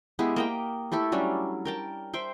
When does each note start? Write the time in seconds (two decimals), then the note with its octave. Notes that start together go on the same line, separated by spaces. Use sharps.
0.19 G#3 B3 E4 G4
0.36 A#3 D#5 G5
0.92 A3 E4 G4 A4
1.12 F#3 G3 C#4 D4
1.65 A#4 G5 A5
2.13 C5 E5 G5